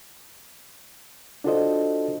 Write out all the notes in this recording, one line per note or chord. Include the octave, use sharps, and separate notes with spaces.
D4 F4 F#4 A4 C5 D#5